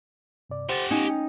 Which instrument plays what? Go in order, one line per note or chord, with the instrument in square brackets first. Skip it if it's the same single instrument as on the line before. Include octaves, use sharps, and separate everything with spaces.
[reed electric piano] G2 C3 D5
[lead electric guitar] G4 F#5 [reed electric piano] C5 A6
[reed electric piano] B3 [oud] C#4 [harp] D#4
[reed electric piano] G5